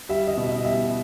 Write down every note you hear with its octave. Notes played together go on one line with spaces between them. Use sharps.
G3 E5
D#5
B2
D#5
G3 E5